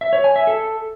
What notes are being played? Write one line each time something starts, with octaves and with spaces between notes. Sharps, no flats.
E5
C#5
G#5
E5
A4